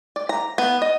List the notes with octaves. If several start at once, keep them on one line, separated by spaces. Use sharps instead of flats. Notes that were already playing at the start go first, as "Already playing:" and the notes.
D5
A#5
B3
D#5